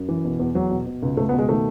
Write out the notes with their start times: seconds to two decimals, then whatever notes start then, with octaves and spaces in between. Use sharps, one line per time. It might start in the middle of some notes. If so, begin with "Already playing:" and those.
Already playing: F#2
0.09 E3
0.25 B2
0.39 E2
0.55 E2 F#3
0.70 B2
0.86 B2
1.03 C#2
1.17 C#2 A3
1.29 B3
1.34 B2 G#3
1.49 D#3 A3